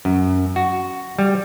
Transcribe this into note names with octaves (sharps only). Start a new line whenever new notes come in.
F#2
F#4
G3